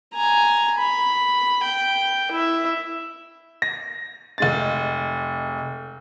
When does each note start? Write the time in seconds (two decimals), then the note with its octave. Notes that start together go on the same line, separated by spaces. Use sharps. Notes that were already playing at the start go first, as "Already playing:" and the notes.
0.14 G#5 A#5
0.77 B5
1.64 G5
2.31 E4 E5
3.62 A#6
4.38 F1 G#3 A6